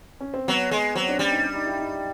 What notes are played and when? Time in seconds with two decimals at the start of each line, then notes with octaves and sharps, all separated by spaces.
0.20 C#4
0.34 C4
0.48 F#3 B3
0.71 G#3
0.95 F#3 C4
1.08 D4
1.19 G3 C#4
1.31 D#4
1.43 D4
1.54 D#4
1.66 E4
1.78 D#4